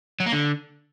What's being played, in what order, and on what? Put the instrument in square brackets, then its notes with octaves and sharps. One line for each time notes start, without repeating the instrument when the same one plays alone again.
[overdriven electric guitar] F#3
A#3
D3